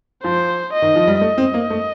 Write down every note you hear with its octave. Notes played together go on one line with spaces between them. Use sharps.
F3 C5
D#5
D#3
F3
G3
A3 D#5
C4
A#3
A3